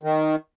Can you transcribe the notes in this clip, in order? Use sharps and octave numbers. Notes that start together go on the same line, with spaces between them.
D#3